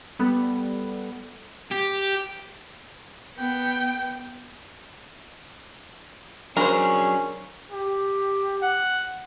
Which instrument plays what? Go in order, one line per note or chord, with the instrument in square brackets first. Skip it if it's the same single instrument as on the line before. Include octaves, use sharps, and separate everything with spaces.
[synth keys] G3 B3 A4
[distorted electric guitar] G4
[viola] B3 G5
[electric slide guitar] F#3 D4 G#4 [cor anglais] C#4 [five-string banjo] A#4 C5
[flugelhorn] G4
[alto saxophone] F#5